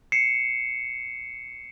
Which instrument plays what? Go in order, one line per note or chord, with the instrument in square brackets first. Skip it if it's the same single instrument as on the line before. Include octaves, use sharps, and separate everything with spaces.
[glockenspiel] C7 C#7 E7